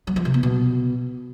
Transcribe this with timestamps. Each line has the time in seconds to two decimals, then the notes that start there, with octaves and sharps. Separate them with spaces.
0.07 F#3
0.16 F3
0.25 C3
0.34 B3
0.43 B2